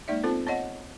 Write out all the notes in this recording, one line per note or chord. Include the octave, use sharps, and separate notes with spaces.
G#3 A#3 D#4 D5 E5
B3 C4 F4 A4 C5
B3 C#5 D#5 F#5